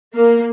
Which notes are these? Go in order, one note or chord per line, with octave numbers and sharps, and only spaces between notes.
A#3